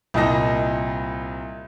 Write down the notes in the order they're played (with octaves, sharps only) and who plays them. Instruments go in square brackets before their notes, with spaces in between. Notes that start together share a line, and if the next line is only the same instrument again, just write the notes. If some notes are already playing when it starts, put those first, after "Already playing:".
[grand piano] C2 A#2 D#5 A5 A#6